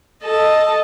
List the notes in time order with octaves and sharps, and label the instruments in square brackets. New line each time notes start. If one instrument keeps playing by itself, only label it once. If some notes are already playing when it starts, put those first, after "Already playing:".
[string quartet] A4 D#5 A5